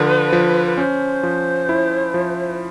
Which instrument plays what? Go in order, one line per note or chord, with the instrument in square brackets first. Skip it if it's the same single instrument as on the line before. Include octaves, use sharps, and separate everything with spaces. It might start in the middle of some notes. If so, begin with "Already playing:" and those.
Already playing: [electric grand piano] D3 F3 [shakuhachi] B4
[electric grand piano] F3
[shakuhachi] B4
[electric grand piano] C#4 [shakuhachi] C5
[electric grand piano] F3
E4
F3